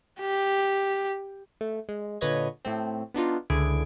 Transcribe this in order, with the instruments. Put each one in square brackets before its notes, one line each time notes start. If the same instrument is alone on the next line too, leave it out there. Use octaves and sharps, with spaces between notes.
[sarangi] G4
[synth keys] A3
G#3
A#2 D3 B4 C#5 D#5 G#6
A2 A3 C4
B3 D4 D#4 F4
C#2 D3 E4 G#4 G#6 D7